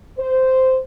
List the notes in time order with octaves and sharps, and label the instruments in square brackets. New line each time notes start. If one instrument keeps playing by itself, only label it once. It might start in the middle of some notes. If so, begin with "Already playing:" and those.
[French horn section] C5